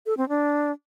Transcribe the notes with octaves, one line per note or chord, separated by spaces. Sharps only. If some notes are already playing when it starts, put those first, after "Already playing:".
A4
C4
D4